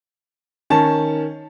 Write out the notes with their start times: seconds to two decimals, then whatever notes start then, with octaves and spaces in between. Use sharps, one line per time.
0.70 D#3 C#4 A5